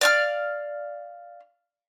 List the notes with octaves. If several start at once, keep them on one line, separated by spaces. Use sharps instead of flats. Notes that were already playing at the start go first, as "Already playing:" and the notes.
D5 F5 F6